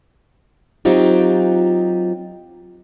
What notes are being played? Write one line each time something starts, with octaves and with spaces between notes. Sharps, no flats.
F#3 C4 D#4 F4 G4